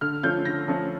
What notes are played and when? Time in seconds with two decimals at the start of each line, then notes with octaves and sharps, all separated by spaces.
0.01 D3 F6
0.23 F3 A3 C#4 F4 G6
0.45 D3 A#6
0.68 F3 A3 C#4 F4